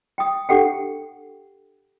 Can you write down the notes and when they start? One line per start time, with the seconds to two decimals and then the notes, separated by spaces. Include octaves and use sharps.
0.18 G5 D#6
0.49 D4 G4 A4 F#5 G5